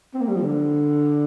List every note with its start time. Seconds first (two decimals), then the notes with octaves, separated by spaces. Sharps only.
0.14 C4
0.21 A#3
0.28 G3
0.35 F3
0.42 D3